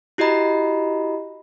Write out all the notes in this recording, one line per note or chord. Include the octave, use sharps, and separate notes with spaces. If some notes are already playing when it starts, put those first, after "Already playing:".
E4 F#4 G4 D#5 A#5 B5